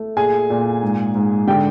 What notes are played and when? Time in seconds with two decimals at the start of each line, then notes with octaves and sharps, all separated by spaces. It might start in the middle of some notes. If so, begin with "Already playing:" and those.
Already playing: A3
0.16 A#2 G#4 G#5
0.50 A#2
0.82 G#2
1.15 G#2
1.47 D3 G4 G5